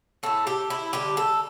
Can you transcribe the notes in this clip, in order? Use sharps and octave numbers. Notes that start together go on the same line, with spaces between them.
A2 A3 A4
G4
E4
D3 G3 G4
A4